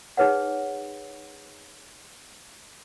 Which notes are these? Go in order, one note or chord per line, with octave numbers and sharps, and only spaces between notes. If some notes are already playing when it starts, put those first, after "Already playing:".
D#4 G#4 B4 C#5 F#5